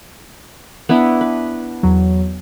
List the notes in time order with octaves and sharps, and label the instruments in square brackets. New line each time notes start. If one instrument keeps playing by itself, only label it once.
[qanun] B3 D4 E4
B4
[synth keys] E2 F#3